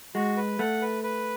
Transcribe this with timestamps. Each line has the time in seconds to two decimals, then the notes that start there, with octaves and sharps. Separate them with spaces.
0.15 G#3 F#4
0.37 B4
0.59 A3 F#5
0.81 B4
1.03 B4